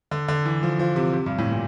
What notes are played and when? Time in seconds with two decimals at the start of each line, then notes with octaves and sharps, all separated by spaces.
0.11 D3
0.28 D3
0.45 E3
0.63 F3
0.79 F3
0.96 C3
1.13 C3
1.26 G2
1.38 A2
1.51 A#2